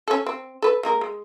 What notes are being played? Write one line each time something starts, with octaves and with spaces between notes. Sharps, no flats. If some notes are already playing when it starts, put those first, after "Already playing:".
C#4 A4
C4
A4 B4
G#3 A#3 A#4
G#3